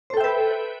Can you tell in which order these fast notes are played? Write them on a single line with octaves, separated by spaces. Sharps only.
C5 A4 G5 E5 B4